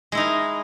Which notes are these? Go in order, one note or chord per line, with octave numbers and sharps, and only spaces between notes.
G#3 D#4 E4 A#4